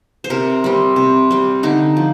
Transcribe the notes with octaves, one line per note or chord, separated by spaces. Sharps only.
C5
C3 A#4
G3 C4
C3
G3 C4
D3 D#4
F3